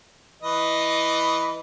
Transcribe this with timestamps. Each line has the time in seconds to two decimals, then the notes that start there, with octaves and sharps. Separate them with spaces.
0.42 E3 B4 D#5